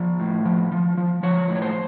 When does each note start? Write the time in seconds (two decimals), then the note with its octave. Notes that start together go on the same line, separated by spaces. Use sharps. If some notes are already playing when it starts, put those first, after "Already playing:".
Already playing: F3 D5
0.20 A2
0.45 F3
0.72 F3
0.97 F3
1.23 F3 C#5
1.48 A2
1.55 C#5
1.62 C5